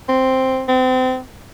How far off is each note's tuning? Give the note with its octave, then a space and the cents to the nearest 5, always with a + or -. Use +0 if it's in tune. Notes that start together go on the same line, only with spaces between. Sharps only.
C4 +0
C4 -30